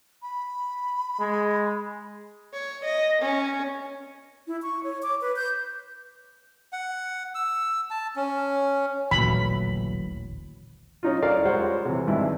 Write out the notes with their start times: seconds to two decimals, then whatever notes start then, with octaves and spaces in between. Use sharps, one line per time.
0.22 B5
1.19 G#3
2.53 C#5
2.84 D#5
3.21 C#4
4.47 E4
4.63 C#6
4.84 C#5
5.03 D6
5.21 B4
5.36 G6
6.73 F#5
7.35 E6
7.90 A5
8.16 C#4
9.11 D#1 A1 D2 A#2 D3 E3 F#3 B5
11.03 C#4 D#4 F4
11.23 A#4 C#5 D5 F5
11.45 G3 G#3 F4 C5 C#5 F#5
11.85 C3 E3
12.07 G#1 G2 E3 E4